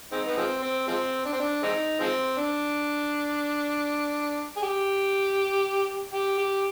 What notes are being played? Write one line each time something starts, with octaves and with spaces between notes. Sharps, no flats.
G#3 C4 D#4
B3
F3 G#3 C4
C4
F3 G#3 C4
D4
C4
D4
G#3 C4 D#4
F3 G#3 C4
D4
G#4
G4
G4
G4